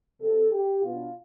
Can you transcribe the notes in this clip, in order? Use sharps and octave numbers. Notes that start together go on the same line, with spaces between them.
C3 F3 C4 A4
G4
B2 B3 D4 F4